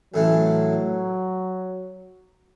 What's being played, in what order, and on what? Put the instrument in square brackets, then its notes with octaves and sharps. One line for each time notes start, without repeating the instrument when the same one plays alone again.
[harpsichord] A1 A2 E3 A3 [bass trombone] F#3